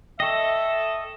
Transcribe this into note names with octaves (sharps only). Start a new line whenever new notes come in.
A4 D#5 E5 G5 C#6